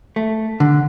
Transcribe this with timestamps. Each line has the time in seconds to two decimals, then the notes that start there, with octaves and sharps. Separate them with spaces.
0.16 A3
0.60 D3